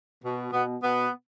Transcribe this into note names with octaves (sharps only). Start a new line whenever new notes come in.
B2
B2 B3
B2 B3